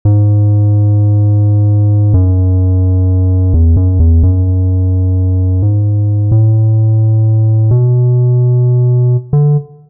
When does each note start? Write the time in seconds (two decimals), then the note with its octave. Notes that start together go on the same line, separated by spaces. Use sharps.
0.05 G#2
2.14 F#2
3.54 E2
3.76 F#2
4.00 E2
4.23 F#2
5.62 G#2
6.32 A2
7.71 B2
9.33 D3